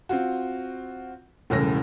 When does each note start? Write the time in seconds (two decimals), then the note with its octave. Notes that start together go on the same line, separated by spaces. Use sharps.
0.09 C4 F4 F#4
1.50 E1 C2 A2 C#3 E3 A#6